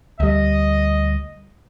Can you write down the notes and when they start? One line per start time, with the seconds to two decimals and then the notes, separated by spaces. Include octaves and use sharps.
0.20 D2 G3 D#5